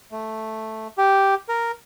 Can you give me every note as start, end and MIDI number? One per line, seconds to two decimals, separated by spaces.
0.12 0.88 57
0.98 1.35 67
1.49 1.72 70